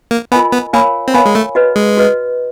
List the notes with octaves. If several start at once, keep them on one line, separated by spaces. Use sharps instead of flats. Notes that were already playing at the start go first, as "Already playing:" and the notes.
A#3
B3 F4 A#4 D#5 G#5 B5
B3
A#3 A#4 C#5 F5 G#5 B5
C4
B3 A#4 C#5 F5 G#5 B5
G#3
A3
F#4 B4 D#5
G#3
F#4 B4 D#5